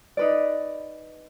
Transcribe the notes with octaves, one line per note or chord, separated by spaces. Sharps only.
D#4 B4 D5